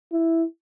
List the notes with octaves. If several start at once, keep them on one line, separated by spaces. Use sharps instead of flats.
E4